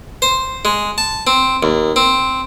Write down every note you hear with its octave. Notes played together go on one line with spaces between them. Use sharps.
C5
G#3
A5
C4
D#2
C4